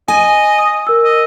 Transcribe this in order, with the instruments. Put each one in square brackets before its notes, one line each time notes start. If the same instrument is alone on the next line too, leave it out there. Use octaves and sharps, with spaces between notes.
[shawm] D#5 [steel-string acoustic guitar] G#5
[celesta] D#6
A#4 E6
[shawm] D#5